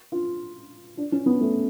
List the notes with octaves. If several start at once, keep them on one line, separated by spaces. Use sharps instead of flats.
F4
D4
C#4
B3
A3